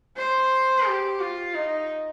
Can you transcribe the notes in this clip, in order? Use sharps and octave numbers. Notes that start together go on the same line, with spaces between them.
C5
G4
F4
D#4